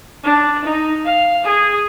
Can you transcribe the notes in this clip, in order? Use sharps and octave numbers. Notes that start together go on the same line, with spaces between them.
D4
D#4
F5
G#4